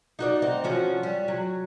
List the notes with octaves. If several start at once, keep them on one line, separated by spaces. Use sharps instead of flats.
D#4 F#4 D5
C4 D#4
F3 C#4 F#4
G3
F#3